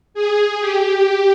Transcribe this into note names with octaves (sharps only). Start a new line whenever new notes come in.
G#4
G4